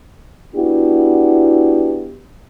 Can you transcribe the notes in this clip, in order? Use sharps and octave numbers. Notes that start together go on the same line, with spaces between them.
B3 D4 E4 F#4 G4